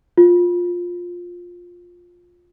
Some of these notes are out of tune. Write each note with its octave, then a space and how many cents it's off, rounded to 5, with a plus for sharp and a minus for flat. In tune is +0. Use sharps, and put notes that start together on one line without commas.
F4 +15